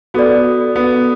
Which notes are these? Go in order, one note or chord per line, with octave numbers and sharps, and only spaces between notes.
B3 F#4 A4 D5
B3